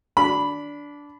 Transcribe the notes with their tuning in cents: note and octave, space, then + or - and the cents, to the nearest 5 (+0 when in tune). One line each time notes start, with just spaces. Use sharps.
D4 -15 B5 +0